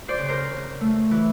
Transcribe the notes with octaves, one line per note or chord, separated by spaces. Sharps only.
C5 D5
C#3
A#4 C5
C#3
A3
E3